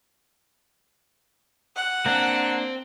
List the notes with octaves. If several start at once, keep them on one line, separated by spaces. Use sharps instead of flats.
F#5
A#3 C4 D4